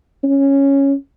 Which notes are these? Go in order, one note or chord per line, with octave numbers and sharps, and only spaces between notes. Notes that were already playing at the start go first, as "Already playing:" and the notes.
C#4